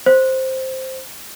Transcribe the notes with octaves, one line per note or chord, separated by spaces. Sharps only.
C5